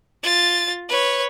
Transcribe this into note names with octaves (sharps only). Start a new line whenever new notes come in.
F4 A6
B4 C#5